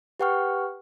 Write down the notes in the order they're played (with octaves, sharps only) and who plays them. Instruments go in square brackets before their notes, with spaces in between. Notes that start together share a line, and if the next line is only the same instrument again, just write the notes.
[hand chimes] G4 B4 F#5 G5 C#6 F6